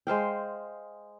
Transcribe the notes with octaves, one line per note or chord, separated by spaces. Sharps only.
G#3 C5 F5 G5